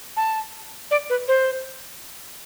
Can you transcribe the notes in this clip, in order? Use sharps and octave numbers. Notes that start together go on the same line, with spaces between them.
A5
D5
B4
C5